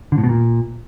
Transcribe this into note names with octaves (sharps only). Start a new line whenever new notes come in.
D3
A2
B2
A#2